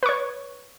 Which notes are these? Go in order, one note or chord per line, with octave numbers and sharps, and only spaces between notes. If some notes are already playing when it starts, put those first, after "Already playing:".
B4 C#5 C#6